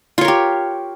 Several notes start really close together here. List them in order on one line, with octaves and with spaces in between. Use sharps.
F4 C#5 A#4 G4